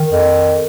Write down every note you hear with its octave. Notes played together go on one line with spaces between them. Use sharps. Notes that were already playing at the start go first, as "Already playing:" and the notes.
Already playing: D#3
F2